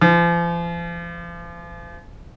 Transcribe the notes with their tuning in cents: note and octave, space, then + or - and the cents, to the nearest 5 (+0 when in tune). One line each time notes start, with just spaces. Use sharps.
F3 -40